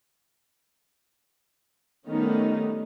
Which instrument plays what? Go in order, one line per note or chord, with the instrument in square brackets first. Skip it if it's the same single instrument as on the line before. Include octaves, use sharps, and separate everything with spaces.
[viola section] D#3 G3 A3 B3 C#4 D#4